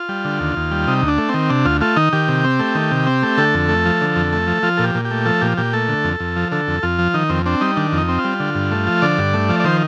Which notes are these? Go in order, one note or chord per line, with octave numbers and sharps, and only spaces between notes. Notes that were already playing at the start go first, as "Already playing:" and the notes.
Already playing: F4
G3
D3
D#2
D#2
G3
C3 D#4
D2
D4
A3
C4
D#3
C3 D4
D2 F4
A3 F4
D#3 D#4
D#3 G4
C3
C4
A3
D#3
C3
C4
A3
D3 A4
F2
A3
F3
D3
F2
A3
F3
F3 F4
A#2 A4
G4
A#2
G4
A3
F3 A4
A#2 G4
A#2 G4
A3 A4
D3
F2
F2
F3
D3 A4
F2
F2 F4
F3
D#3 D#4
F2 C4
C4 D4
G3 D#4
D#3 D4
F2
D#4
C4
F4
G3
D3
G2
A3
F3
D3 D5
G2
A3
F3
D5
D#3 C5